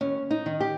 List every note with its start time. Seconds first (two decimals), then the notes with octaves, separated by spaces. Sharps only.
0.01 D#2 C#4
0.31 D#4
0.46 D#3
0.61 G4